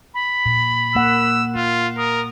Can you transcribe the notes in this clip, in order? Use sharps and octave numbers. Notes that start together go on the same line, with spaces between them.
B5
A#2
A#3 F#5 E6
A#3 F4
A#4 D#6